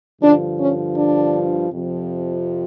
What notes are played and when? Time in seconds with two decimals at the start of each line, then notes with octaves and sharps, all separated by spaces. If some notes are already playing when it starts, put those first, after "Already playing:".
0.21 G2 D3 F3 D4
0.59 C#4
0.96 D4
1.70 F2 C3 F3